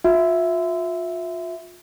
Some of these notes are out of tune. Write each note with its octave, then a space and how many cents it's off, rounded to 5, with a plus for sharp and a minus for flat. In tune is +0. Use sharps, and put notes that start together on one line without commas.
F4 +35 E5 +0